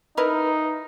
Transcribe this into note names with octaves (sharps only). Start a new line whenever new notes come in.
D#4 E4 A#4 B4